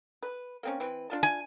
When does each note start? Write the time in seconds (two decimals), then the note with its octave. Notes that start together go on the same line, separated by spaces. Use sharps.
0.23 B4
0.63 A#3 C4 C#4
0.80 E3 C4 B4
1.10 D4 F4 A5
1.23 G#5